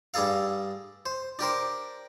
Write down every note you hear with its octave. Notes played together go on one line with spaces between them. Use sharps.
G2 D4 G#4 A4 F5
C5
D4 G4 A#4 C5